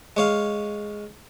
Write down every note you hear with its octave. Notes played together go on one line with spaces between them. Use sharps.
G#3 C#5 F5